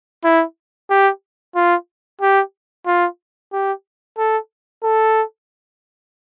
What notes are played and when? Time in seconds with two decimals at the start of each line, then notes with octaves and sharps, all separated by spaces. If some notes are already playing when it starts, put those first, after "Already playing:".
0.24 E4
0.90 G4
1.56 F4
2.21 G4
2.87 F4
3.52 G4
4.18 A4
4.84 A4